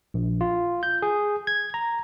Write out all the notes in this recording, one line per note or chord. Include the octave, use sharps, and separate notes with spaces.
A#1
F4
G6
G#4
G#6
A#5